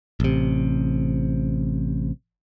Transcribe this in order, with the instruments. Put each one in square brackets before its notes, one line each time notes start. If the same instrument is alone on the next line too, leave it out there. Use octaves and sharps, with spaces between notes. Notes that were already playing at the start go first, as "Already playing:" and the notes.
[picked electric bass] A1 C3